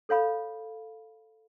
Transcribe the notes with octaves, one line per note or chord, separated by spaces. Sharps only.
A4 C#5 F5 B5